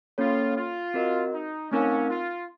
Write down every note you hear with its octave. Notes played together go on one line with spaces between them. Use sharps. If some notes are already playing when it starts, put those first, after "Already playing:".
A#3 C#4 F4 A4 C#5
F4
C4 F#4 A#4 D#5
D#4
A3 C4 C#4 D#4 A#4 F5
F4